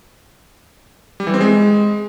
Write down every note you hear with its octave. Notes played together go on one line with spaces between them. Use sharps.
G3
E3
C4
G#3